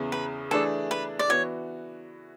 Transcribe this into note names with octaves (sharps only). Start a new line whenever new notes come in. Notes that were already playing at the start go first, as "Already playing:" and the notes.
Already playing: E2 C#3 E3 B3
B4
E3 A3 D4 G#4 A4 D5
B4
D5
E3 B3 F#4 C#5